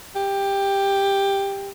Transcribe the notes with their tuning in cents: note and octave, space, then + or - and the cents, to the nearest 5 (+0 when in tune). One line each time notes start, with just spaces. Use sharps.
G4 +10